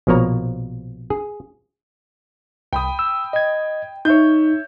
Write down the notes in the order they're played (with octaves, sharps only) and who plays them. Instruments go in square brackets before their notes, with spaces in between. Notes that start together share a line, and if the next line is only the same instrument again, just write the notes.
[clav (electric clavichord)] A#1 B2 F3 A#3 C#5 A#5
G#4
[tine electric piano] C2 [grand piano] G5 B5 D#6
[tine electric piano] E6
D#5 G#6
[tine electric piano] D#4 [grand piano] C#5 E5 G6